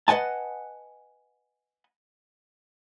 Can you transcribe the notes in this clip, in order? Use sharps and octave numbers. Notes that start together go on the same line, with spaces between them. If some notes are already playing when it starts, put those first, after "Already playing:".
B4 D#5 F#5 G#5 A5